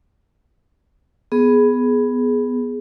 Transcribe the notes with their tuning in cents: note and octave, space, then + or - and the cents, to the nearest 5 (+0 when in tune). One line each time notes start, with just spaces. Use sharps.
B3 +0 G#4 +10